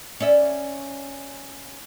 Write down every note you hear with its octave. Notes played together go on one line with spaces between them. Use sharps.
C#4 D5 E5